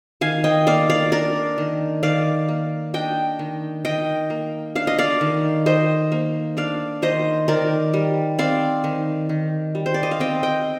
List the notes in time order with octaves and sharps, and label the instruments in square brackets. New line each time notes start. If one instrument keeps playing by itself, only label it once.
[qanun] D#3 F5 G#5
D#5 G5
A#3 D5 F5
D5 F5
D4 A#4 D5
D#3
D#3 D5 F5
A#3
D4 D#5 G5
D#3
D#3 D#5 G5
A#3
D4 F5
D#5
D5 F5
D#3
D#3 C5 D#5
A#3
D4 D5 F5
D#3 C5 D#5
D#3 A#4 D5
G3
C4 D5 F5
D#3
D#3
G3
C5
D5
D#5
F5
C4 D#5 G5
D#5 G5